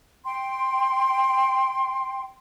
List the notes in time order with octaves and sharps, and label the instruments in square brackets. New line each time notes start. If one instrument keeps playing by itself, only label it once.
[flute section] G5 C6